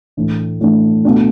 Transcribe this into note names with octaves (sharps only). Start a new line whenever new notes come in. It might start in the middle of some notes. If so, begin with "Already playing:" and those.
A2 E3 A3 D4
A2 E3 A3 D4
B2 A3 D4